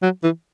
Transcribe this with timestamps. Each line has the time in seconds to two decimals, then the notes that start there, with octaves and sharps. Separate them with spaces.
0.02 F#3
0.23 E3